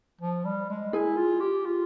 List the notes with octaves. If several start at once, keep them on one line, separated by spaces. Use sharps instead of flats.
F3
G3
G#3
E4 G#4 G#5
F4
G4
F4